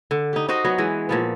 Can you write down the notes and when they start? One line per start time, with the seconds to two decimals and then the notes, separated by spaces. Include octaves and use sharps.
0.11 D3
0.33 D#4 G4
0.48 D#4 F#4 C5 D#5
0.65 F#3 B3
0.78 E3 G#3
1.09 A#2 F3 B3